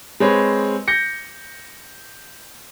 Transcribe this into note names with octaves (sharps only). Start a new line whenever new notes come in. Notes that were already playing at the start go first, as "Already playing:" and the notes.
G#3 C4 B4 C#5
G6 A#6 C#7